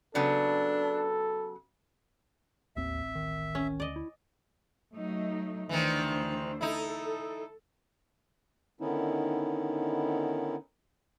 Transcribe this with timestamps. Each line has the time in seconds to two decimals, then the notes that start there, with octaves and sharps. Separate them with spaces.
0.15 C#3 F#3 B3 D4 A4
2.76 D1 A1 D#2 C4 E5
3.15 D#3
3.55 C#4
3.80 D2 D5 D#5
3.96 E4
4.95 F#3 A3 D#4
5.69 D2 D#3 E3 D4 C5
6.61 D#4 E4 A4
8.81 D3 D#3 B3 C#4 D#4 E4